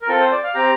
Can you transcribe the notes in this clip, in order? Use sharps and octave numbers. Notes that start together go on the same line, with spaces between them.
A#4
C4 F4 A4
C5
D5
F5
C4 G4 A#5